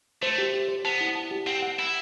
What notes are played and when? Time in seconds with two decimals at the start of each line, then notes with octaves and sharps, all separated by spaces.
0.22 A3 C5
0.38 G4
0.54 G4
0.68 C5
0.85 B3 A5
1.01 E4
1.15 A5
1.31 G4
1.47 C4 F#5
1.62 F#5
1.78 E4 F#5